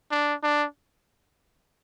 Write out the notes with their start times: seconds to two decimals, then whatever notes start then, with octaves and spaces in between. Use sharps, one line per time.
0.11 D4
0.43 D4